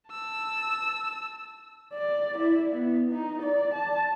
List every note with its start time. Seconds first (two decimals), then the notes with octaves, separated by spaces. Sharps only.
0.11 A5 E6
1.93 D5
2.38 E4
2.71 B3
3.12 D#4
3.42 D5
3.74 A5